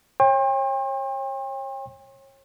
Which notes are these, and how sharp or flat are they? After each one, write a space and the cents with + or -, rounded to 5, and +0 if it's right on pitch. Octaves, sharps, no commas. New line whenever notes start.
C#5 -30 G5 +35 C6 +45